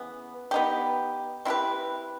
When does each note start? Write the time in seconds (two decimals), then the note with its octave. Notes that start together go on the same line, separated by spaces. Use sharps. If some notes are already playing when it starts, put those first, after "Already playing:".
Already playing: C#3 E3 B3
0.51 B3 D#4 G4
1.45 C4 E4 G4 B4